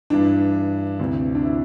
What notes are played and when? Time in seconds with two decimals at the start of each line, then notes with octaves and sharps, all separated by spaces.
0.10 G2 E3 D4
0.99 D2 C3 E3
1.35 D4
1.43 E4